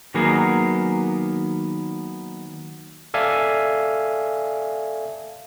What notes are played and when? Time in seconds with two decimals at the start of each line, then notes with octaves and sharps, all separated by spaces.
0.14 D#3 F#3 A#3 B3 G#4 A#4
3.14 A4 D5 E5 F5 G#5